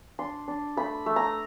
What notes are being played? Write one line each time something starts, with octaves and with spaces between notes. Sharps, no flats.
D4 C6
D4
A3 B5
A3
A#5